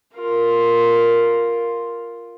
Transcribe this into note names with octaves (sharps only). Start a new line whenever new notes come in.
F4 A#4